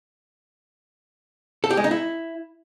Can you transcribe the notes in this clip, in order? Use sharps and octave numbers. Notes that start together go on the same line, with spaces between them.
A4
G4
G#3
D#4
E4